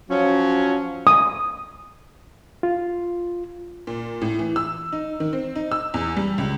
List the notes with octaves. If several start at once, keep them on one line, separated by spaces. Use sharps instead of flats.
F3 F#3 C#4
D#6
F4
A#2
A2
E3
E6
D#4
D#3
C4
D#4
E6
E2
G3
C#2